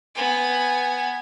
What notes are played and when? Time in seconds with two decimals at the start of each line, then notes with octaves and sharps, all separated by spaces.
0.15 B3 G#5